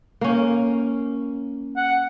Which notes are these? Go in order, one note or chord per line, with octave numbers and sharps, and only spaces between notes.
A#3 C#4
F#5